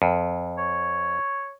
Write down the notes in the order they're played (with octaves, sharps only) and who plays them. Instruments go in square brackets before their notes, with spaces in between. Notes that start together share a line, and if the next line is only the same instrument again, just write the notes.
[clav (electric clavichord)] F2
[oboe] C#5